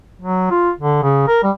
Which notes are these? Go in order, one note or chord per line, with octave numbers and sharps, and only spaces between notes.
F#3
F4
D3
C#3
A#4
G3